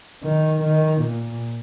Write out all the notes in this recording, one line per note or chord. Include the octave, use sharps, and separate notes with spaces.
D#3
D#3
A#2